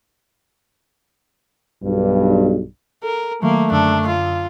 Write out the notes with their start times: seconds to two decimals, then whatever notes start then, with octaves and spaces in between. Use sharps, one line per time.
1.83 B1 G2
3.03 A4 A#4
3.42 D#3 F#3 A3 A#3
3.71 F#2 D3 D4 E6
4.07 F4